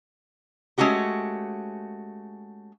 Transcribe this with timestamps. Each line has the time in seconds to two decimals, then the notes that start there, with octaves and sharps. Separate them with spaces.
0.78 G#3 A3 C#4 F#4 G4